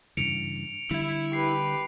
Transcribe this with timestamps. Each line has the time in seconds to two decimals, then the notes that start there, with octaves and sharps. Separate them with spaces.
0.17 G2 C#3 E3 C#7 D7 F7
0.91 D3 G3 E4 E5
1.33 G4 B4 C7